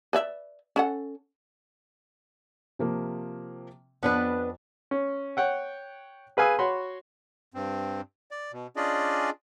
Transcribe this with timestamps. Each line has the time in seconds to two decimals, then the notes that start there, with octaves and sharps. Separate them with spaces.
0.13 B4 D5 E5
0.76 C#4 A4 F#5
2.79 C3 F3 A#3
4.03 F2 B3 D4 B4
4.91 C#4
5.37 C#5 F#5 G5
6.37 G#4 B4 F5 G#5 D#6 E6
6.59 F#4 C#5 B5 C6
7.54 G2 C4
8.31 D5
8.52 B2
8.76 C#4 D4 F4 G#4 D5 D#5